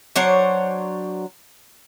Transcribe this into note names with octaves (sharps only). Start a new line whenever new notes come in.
F#3 D4 C5 C#5